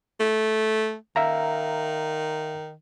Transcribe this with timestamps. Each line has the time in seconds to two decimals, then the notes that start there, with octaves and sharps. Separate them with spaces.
0.20 A3
1.16 D#3 E5 F5 A#5